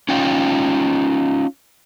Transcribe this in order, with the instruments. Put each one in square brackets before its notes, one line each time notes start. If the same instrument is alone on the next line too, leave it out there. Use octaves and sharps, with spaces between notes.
[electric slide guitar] C#4 D#4 F4 G5